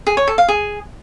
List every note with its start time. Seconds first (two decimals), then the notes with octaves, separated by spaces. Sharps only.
0.07 G#4
0.17 C#5
0.27 A4
0.38 F5
0.48 G#4